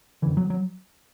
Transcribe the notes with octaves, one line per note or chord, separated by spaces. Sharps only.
F#2 D3 E3
F#3
F#3